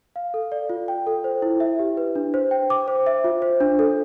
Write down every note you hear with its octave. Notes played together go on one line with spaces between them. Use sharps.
F5
A4
D5
F4
G5
A4
C5
E4
E5
G4
B4
D4
C5
G5
D6
C5
E5
F4
C5
D4
A4